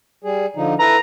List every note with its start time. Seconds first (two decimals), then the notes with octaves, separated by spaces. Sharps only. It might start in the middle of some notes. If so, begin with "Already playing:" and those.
0.24 G3 G#4
0.56 D3 F3 D#4
0.80 E4 A4 B4 A#5